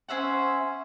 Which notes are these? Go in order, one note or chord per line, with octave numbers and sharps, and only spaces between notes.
C#4 C5 E5 F#5